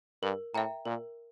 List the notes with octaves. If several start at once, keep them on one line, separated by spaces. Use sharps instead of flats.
G2 A#4
A2 E5 G5 A#5
A#2 A#4